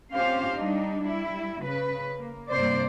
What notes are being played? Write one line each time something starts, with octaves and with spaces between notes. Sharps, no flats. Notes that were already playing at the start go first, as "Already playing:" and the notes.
C4 C#4 F4 G4 C5 F5
G3 D4 D#4
G3 E4
C#3 B4
A#3
G2 C3 A#3 C5 D5